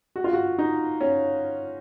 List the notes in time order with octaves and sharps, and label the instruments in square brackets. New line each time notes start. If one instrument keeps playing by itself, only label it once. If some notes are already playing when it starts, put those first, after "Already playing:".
[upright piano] F#4
F4
F#4
D#4
C#4